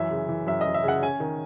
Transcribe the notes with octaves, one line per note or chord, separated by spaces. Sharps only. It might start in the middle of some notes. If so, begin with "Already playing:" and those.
Already playing: F#2 E3 E5
C#3
E3
F#2 E5
F#2 D#5
E5
C#3 F#5
C#4 G#5
D#3